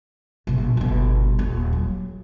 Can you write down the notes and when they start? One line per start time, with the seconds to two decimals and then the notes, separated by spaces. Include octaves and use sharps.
0.47 A#1 B2
0.77 G1 B2
1.39 D#1
1.73 F#3